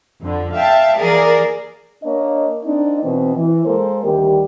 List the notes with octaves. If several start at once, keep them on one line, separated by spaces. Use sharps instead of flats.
F2 D3
E5 F5 G5 A5
E3 A#3 G#4 A#4 D5
A#3 D4 C#5 D#5
A#3 C4 D4 D#4
B2 E3 C4
E3
G#3 A#3 A4 A#4 C5
D2 D#3 G3 G4